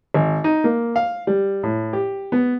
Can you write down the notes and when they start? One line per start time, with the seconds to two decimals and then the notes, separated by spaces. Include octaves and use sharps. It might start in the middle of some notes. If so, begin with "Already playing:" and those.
0.14 G#1
0.44 D#4
0.64 A#3
0.96 F5
1.27 G3
1.63 A2
1.93 G4
2.32 B3